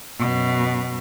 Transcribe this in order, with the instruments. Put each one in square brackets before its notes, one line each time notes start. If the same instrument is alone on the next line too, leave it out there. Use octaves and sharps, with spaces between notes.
[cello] F#2 B2